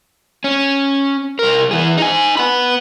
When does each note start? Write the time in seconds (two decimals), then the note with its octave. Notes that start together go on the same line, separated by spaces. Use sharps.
0.44 C#4
1.39 C2 A#4
1.71 E3 G#4
1.98 D#4 G#5
2.37 B3 B5